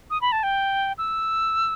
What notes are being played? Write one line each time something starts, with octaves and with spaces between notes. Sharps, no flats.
D#6
B5
A5
G5
E6